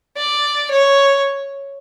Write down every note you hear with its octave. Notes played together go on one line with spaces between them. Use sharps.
D5
C#5